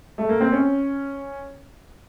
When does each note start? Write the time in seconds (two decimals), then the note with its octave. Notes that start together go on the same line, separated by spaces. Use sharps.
0.18 A3
0.29 A#3
0.41 C4
0.52 C#4